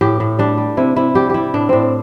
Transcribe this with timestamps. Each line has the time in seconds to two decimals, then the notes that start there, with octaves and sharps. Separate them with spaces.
0.01 A2 G4
0.20 A2
0.39 G3 D4
0.58 G3
0.77 C3 E4
0.96 C3 E4
1.15 G3 G4
1.30 G3 E4 G4
1.54 A2 D4
1.69 A2 C4 D4